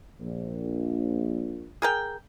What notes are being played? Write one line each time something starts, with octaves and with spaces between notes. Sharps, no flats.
A#1
G#4 A#4 G5